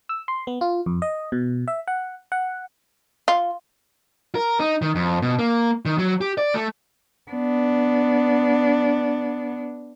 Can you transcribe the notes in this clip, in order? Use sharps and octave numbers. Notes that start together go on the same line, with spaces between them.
E6
C6
B3
F4
F2
D#5
B2
E5
F#5
F#5
F4
A#4
D#4
D#3
F2
B2
A#3
D#3
F#3
G4
D5
A3
B3 D4